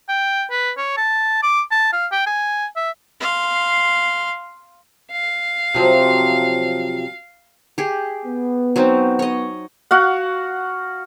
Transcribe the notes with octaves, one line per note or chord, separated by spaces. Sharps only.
G5
B4
C#5
A5
D6
A5
F5
G5
G#5
E5
F5 C6
F5
C3 F3 F#3
G4 G#4
B3
F#3 C4 D#4
C#5 D#5
F#4 F5 F#5